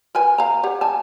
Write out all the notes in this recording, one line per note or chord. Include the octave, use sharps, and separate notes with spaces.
A#4 B4 G#5
F5 A#5
G4 C#5 F#5
G#5 A5